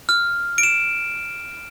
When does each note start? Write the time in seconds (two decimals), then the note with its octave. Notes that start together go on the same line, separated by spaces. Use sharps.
0.09 F6
0.58 D7
0.63 E7